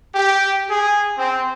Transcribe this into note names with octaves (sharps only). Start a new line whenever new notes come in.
G4
G#4
C4